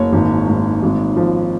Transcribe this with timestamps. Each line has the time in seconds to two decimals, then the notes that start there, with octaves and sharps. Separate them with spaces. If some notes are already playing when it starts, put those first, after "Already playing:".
Already playing: F#1 C#5
0.13 G#1
0.47 G#2
0.83 G#1
1.16 F3